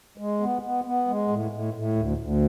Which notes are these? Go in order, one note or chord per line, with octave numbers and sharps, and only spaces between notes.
G#3
B3
B3
B3
G#3
A2
A2
A2
D2
D2